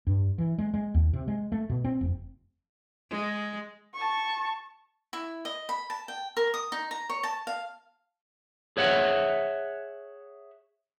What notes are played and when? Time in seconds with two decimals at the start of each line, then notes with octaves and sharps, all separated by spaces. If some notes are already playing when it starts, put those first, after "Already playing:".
0.07 G2
0.38 E3
0.58 G#3
0.74 G#3
0.94 D#2
1.13 C3
1.28 G#3
1.52 A3
1.70 B2
1.84 C4
2.01 F1
3.10 G#3
3.94 A5 C#6
5.13 E4
5.45 D#5
5.69 B5
5.90 A5
6.08 G5
6.37 A#4
6.54 D#6
6.72 D#4
6.91 A#5
7.09 C#5
7.23 A5
7.47 F5
8.77 G#4 C#5 E5 F#5